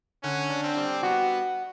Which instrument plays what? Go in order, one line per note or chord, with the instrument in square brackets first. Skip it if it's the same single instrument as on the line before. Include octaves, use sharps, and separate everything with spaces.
[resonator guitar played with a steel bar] D3 [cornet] C#4
[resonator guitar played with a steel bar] D4
[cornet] C4
[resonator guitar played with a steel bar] G3
[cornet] B3 [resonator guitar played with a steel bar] F#4